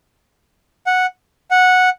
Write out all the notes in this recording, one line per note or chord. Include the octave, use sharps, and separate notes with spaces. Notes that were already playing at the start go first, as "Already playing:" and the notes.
F#5
F#5